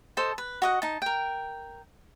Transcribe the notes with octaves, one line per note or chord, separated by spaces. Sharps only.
A4 C5 D#5 A5
B4
F#4 D#5 F#5
D#4 A5
A#4 G5